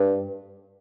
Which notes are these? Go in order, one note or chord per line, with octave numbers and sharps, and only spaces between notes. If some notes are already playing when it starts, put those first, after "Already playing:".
Already playing: G2